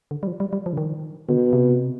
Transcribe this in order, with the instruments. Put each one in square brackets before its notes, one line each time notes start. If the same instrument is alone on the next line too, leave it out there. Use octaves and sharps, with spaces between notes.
[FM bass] D3
G3
F3
G3
G3
F3
D3
D#3
[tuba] B2 [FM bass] D3
[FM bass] C3